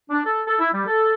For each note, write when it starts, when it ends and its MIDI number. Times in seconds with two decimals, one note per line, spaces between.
0.10 0.20 62
0.25 0.40 69
0.46 0.54 69
0.59 0.69 64
0.73 0.83 55
0.86 1.13 69